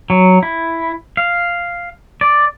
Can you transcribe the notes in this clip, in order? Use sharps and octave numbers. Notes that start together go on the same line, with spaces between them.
F#3
E4
F5
D5